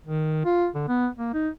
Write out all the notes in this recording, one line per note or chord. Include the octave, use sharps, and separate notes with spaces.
D#3
F4
D3
B3
A#3
D#4